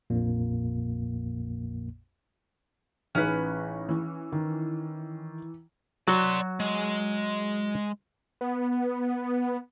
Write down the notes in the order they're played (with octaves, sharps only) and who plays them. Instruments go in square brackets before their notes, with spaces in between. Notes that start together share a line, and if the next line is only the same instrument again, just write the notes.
[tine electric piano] A#1 F2 A#2 A#3
[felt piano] A1 D#4 G#4 [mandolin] C#4 B4
[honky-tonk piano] E3
[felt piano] D#3
[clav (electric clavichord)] F#3 F#4 [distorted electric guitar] D5 C6
[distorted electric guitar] G#3
[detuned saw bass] B3